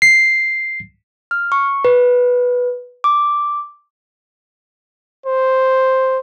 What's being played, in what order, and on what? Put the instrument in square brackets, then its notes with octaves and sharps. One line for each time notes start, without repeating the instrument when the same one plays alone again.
[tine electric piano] C7
[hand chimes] F6
C#6
B4
D6
[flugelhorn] C5